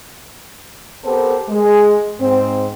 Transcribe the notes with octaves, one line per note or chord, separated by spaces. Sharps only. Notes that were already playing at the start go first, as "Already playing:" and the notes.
B3 C4 G4 A4 A#4 C5
G#3
G#2 C4